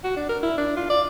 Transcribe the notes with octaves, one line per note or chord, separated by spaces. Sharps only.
F#4
D4
A#4
E4
D4
F4
D5